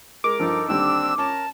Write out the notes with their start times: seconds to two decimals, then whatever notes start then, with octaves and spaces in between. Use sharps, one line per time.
0.24 G#3 A#4 D6
0.40 G2 F3 D#4 A4
0.68 D#2 D3 G3 C4 D4 E6
1.18 C#4 A#4 A5 A#5